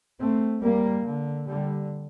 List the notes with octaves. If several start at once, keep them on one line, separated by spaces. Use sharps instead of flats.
A3 C4
G3 A#3
D3
D3 G3